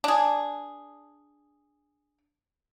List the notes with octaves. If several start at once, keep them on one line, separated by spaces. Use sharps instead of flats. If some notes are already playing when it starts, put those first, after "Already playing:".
D4 G#4